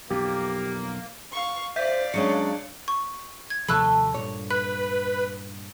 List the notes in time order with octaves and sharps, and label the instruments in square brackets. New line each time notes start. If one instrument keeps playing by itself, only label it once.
[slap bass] B1 F2 [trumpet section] A#3 [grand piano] G4
[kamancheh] F5 C#6
[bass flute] C5 [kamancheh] D5 F5 [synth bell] E5 G6 B6
[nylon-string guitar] F#3 G#3 C#4 [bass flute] D4 [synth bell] C#5 C#7
[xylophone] C#6
G#6
[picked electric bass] D#2 C3 F3 [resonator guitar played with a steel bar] A3 A4 [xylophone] B5 E6 F#6
[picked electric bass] G2 A#2 [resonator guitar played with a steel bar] C#5
[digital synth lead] B4 [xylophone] F#6